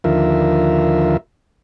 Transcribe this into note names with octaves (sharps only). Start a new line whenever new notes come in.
D#2 D3 F3 F4 A#4 E5